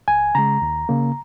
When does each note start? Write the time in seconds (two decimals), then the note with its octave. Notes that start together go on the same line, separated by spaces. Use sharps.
0.08 C#2 G#5
0.35 C#3 G#3 A#5
0.62 D#2
0.89 C#3 A#3